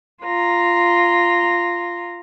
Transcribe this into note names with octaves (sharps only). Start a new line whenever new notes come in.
F4 A#5